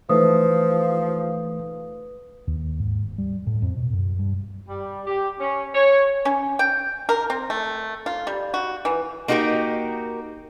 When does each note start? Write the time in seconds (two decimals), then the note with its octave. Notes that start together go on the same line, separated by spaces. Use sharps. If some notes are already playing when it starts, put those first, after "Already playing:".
0.09 E3 F3 A3 D#4 B4 D#6
2.47 D#2
2.80 G#2
3.04 D#1
3.18 G3
3.47 A2
3.62 F2
3.77 B2
3.93 F#2
4.19 G2
4.68 G3
5.07 G4
5.40 C#4
5.75 C#5
6.25 C#4
6.59 G5
7.09 A#4
7.30 C4
7.50 A3
8.06 F4
8.27 G3
8.54 F#4
8.85 E3
9.28 A#3 D#4 F#4 G4 A#4